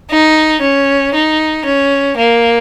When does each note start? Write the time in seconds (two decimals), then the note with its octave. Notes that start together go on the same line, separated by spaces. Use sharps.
0.10 D#4
0.61 C#4
1.14 D#4
1.65 C#4
2.17 A#3